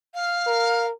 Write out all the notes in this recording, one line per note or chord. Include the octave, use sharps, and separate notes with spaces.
F5
A#4